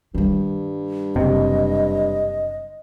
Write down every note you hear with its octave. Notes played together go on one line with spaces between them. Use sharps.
G2 D#3 G3
F#1 C3 D#5